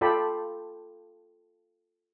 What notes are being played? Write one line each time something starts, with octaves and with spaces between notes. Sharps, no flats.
F4 A4 D5 G5 A5 B5